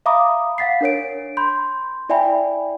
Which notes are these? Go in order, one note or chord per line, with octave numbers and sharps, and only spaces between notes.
E5 F5 A#5 B5 D6 D#6
F5 F#5 A6 B6 C7
D4 A#4 C#5 D7
B5 C6 G6
E4 D5 E5 G5 G#5 B5